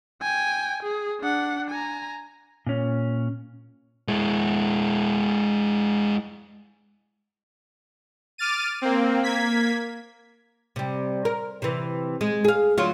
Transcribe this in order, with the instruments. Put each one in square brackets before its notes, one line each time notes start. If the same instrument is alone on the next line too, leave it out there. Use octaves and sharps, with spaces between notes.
[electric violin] G5 G#5
G#4
D4 F#5
G#5 A#5
[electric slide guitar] A#2 C#4
[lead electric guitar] G#3 E4
[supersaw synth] D6 F6 A6 D#7
A#3 C4
A#3 G#6 B6
[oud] C3 G3
A#4
C3 E3
G#3
G#4 F5
D2 F#3 F4